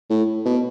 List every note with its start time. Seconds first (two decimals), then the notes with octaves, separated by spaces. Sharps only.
0.10 A2
0.45 B2